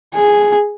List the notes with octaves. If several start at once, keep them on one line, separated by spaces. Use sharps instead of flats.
G#4